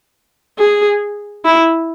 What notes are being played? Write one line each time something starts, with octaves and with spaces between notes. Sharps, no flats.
G#4
E4